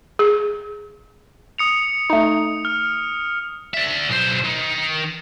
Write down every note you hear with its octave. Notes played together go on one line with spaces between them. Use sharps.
G#4
D#6 C#7 F7
A3 D#4
F6
D5 E5
B1 C5
D#3